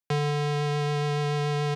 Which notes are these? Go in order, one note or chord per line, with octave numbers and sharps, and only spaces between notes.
D3